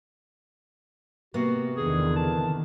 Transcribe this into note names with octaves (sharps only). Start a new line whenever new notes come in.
C3 A#3 B3 F#4
E2 D3 D#3 G#4
A5